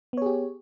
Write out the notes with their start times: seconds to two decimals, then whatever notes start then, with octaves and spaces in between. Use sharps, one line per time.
0.13 B3
0.17 C#5
0.22 G#4
0.26 G4